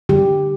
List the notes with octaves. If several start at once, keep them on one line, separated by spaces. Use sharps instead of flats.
D3 G3 G4